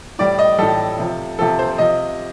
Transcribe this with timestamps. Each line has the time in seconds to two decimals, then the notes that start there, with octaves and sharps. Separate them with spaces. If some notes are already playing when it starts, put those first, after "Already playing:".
0.19 A2 G3 D5
0.39 D#5
0.59 A2 G3 A4
0.99 C3 F3
1.39 C3 F3 A4
1.59 C5
1.78 C3 F3 D#5